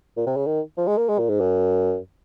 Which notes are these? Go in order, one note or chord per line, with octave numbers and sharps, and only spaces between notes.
A#2
C3
C#3
D#3
F3
G#3
A#3
G#3
A#2
G#2
F#2